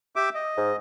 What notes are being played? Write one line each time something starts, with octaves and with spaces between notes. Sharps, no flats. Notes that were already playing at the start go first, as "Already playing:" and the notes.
G4 E5 D6
D#5
G#2